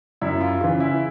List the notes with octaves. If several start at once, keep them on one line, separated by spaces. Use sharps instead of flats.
F#2 E4
F4
C#3 E3 F4
E4